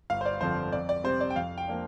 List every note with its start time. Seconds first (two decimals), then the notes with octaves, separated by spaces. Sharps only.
0.10 G1 F5
0.21 C5
0.25 D5
0.41 F2 D3 F3 C4 C5
0.72 F2 D5
0.89 D5
1.04 C3 G3 C4 C5
1.21 D5
1.30 G5
1.36 F2 F5
1.58 G5
1.67 F3 A#3 D4